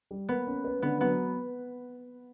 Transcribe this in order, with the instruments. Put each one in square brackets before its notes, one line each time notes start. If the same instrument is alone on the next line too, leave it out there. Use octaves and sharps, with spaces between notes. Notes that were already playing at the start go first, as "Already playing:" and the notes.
[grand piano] G3
[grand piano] A#3 [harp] B3
[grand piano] C#4
B4
[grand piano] D3 [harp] B3
[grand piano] F#3 [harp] B3